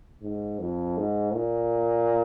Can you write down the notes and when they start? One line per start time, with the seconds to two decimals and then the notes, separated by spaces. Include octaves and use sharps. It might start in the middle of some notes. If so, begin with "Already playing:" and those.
0.22 G#2
0.59 F2
0.97 G#2
1.34 A#2